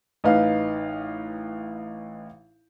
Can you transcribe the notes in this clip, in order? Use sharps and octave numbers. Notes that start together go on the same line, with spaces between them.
A1 D#4 B4 F5